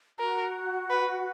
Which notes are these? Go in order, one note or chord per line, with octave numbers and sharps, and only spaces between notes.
F#4 A#4
B4